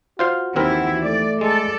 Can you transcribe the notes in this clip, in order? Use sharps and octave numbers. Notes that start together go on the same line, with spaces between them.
F4 F#4 C5 F5
D#2 E3 C4 E4 A#4
A3 D5
G#3 A4 D5